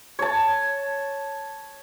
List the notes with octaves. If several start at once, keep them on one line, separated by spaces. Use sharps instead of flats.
C#5 A5